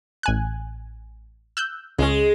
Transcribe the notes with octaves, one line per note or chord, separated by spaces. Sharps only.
A1 G#5 F#6
E6 F#6 G6
C#2 G#3 C#4